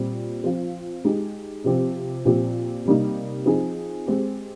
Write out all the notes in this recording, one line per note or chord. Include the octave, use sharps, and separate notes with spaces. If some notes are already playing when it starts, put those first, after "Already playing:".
Already playing: A#2 G3 C4
F3 C4 F4
G#3 D#4 G4
C3 F3 C4 G4
A#2 F3 C4 G4
C3 G3 A#3 D#4
F3 C4 D#4 G#4
G#3 C4 G4